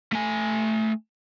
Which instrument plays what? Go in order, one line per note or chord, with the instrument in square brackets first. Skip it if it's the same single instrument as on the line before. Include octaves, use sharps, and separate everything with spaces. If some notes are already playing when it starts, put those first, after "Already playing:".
[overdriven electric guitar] A3 G#5